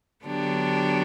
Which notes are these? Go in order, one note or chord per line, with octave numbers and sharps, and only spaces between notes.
D3 F#3 B3 D4 G4